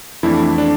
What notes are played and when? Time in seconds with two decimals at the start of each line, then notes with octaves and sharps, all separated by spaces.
0.23 F2 E3 A3 D4 E4
0.58 D4